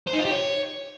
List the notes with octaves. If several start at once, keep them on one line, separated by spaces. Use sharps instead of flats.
C5
D#4
F4
G4
C#5